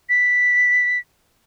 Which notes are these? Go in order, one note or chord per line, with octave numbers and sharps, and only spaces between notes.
B6